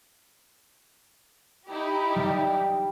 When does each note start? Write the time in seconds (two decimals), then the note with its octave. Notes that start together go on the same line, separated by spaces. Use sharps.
1.68 D#4 E4 G4
2.16 G3